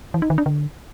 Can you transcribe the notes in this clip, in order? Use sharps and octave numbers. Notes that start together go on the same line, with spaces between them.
E3
D#4
D#3
D4
D3